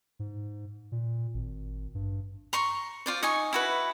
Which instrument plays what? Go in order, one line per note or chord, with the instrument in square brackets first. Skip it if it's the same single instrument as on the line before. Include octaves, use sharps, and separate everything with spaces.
[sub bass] G#2
A#2
G#1
G2
[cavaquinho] A#5 C6 C#6
F4 C5 D5
D#4 D#5 G#5 C#6
E4 F#4 B4